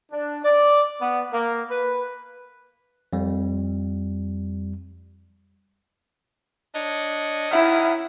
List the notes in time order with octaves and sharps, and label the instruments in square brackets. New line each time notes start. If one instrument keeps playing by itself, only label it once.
[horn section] D4
D5
B3
A#3
B4
[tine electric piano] F2 G3
[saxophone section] D4 C#5 D#5
[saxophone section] D#3 C#4 F#5 [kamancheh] E4